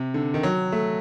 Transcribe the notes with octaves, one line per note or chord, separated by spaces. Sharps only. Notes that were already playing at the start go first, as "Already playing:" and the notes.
Already playing: C3
D3
D#3
F#3
A3